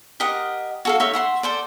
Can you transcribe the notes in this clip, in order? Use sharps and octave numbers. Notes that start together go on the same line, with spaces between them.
G4 A#4 D#5 F#5
F#4 A4 F5
D#4 C#5 E5
E5 F#5 C6
A4 C5 D5